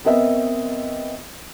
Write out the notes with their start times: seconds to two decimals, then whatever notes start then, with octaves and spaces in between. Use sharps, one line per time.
0.05 B3 C4 A#4 D#5 E5